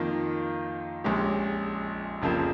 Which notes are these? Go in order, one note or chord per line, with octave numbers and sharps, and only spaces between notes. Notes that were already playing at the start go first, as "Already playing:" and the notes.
Already playing: F2 D#3 A#3 F4
A#1 A#2 G#3 C#4 G4
F1 F2 C#3 F3 A#3